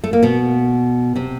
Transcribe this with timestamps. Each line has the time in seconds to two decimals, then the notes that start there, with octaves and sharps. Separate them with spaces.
0.04 A3
0.13 A#3
0.23 B2 B3
1.16 C3 C4